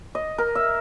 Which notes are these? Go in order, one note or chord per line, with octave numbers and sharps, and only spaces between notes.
D#5
A#4
E5